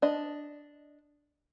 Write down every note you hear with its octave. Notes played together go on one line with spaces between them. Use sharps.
D4 D#5